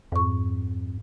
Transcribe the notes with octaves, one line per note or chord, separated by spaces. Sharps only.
F2 G#2 C#6